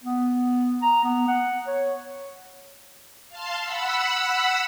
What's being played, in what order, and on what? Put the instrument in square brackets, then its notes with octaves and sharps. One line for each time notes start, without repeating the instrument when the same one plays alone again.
[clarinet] B3
A#5
B3
F#5
C#5
[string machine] F5 A5 C6
F#5 B5 E6